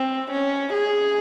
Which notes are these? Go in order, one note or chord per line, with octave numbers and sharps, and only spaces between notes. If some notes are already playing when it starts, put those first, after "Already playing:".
Already playing: C4
C#4
G#4